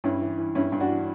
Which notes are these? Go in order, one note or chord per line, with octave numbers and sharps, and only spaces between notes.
G2 C#4 E4
E3
E3
G2 C#4 E4
G2
D4 F#4
E3